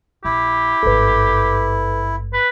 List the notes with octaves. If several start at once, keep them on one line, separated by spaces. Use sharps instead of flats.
A#1 E4 G4
G#1 G2 A4 B4
B4